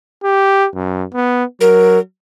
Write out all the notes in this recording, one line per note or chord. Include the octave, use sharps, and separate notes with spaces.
G4
F#2
B3
F#3 A#4